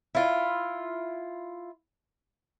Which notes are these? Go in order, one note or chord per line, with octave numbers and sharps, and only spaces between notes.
E4 F4